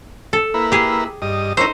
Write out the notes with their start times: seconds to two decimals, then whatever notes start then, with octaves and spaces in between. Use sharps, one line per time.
0.33 A4
0.54 A#3 E4 B4
0.72 G4 G#4
1.22 G2 D#5
1.57 C#4 D#4 E4 A#4 C5